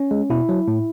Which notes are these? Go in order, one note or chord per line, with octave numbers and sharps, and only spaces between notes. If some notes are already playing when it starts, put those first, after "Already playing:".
Already playing: C#4
G#3
B2 E4
F#3
A2